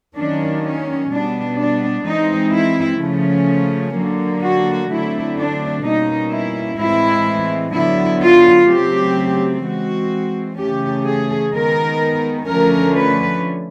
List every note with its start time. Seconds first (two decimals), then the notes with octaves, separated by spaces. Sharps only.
0.16 D#3 F#3 A#3 C#4 D4
0.64 C#4
1.11 B2 G3 B3 D4
1.58 D4
2.06 E3 G#3 C4 D#4
2.53 E4
3.00 C#3 F3 A3 C#4
3.95 D3 F#3 A#3
4.43 F#4
4.90 D3 F#3 A3 C4 E4
5.38 D4
5.84 B2 G3 A#3 C#4 D#4
6.32 E4
6.79 A2 E3 G#3 C4 E4
7.74 D3 F#3 B3 E4
8.21 F4
8.68 C#3 F#3 A3 C4 G4
9.63 E3 G#3 C4 F#4
10.59 C#3 E3 A3 C#4 G4
11.05 G#4
11.53 D#3 G#3 B3 A#4
12.48 D3 F3 A3 C#4 A#4
12.95 B4